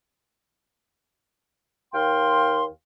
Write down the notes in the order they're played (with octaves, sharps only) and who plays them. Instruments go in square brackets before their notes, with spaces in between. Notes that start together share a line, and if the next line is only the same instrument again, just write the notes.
[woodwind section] D#2 F5 G5 C6